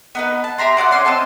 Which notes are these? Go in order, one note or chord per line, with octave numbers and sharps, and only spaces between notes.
B3 D#4 B4
A5
G4 E5 A#5 C6
F#4 D5 D#5 F#5
C#4 C#5 C6 D6
C4 D#5 A5 F#6